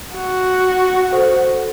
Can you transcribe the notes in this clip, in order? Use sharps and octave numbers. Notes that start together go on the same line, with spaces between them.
F#4
A4 C5 F#5